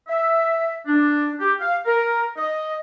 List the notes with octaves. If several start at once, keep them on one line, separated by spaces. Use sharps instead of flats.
E5
D4
G4
F5
A#4
D#5